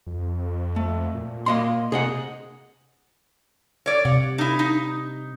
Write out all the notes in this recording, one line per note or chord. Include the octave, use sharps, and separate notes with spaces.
F2
A3
A#2
A#3 D#5 C6
C3 G#4 D#5 F#5
C#5 D5
C3 F#5
D#4 E4
D#4